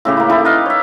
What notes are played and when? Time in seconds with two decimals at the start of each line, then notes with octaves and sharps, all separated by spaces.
0.05 A2 C#3 G4
0.17 A#3 E4
0.30 D#4 E4 G4 A4
0.45 B4 D#5 F5
0.66 C#5 E5